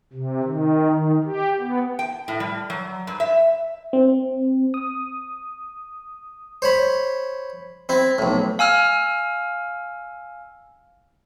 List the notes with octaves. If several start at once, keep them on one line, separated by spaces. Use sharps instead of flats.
C3
D#3
D#3
G4
B3
G5
A2
G3
F#3
G2
E5
C4
D#6
C5 C#5 B5
C4 E4
B1 A2
F5 G#5 E6 F6